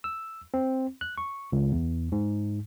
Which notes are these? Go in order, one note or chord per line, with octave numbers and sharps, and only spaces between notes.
E6
C4
F#6
C#6
C#2
E2
G#2